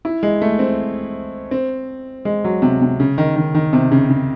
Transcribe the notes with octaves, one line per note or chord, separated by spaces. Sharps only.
E4
G#3
A3
C4
C4
G#3
F#3
C3
C3
C#3
D#3
D#3
D#3
C3
C#3
C#3